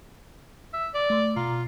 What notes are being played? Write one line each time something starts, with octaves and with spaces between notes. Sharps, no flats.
E5
D5
A3 C6
B2 F4 A#5 C7